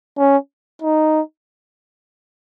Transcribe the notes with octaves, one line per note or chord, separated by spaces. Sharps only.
C#4
D#4